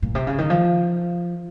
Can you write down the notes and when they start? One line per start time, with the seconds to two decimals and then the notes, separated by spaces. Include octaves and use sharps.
0.02 A#2
0.15 C3
0.27 C#3
0.38 D#3
0.50 F3